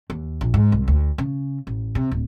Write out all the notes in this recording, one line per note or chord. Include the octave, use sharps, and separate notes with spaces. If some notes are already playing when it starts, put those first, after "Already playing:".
D#2
A#1
G#2
C2
D2
C#3
A1
C3
D1